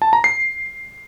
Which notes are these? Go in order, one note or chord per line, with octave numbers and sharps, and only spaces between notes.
A5
A#5
C7